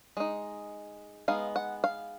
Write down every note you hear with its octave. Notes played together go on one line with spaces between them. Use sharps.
G#3 D#4
G#3 B3 D#4 F5
F#5
F5